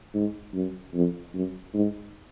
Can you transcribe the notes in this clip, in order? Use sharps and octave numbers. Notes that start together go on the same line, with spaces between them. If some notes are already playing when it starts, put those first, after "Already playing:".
G#2
F#2
F2
F#2
G#2